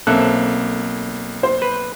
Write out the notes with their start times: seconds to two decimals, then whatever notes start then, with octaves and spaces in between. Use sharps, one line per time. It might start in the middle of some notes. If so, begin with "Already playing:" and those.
0.07 B1 A#3 C4 C#4 A4 E5 F#6
1.43 C5
1.62 B4